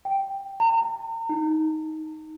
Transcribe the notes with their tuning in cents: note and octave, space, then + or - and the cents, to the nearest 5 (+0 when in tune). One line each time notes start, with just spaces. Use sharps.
G5 +0
A#5 -40
D#4 +15